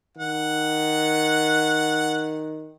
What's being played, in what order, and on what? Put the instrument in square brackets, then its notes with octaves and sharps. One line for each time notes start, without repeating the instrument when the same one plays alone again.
[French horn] D#3 [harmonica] F#5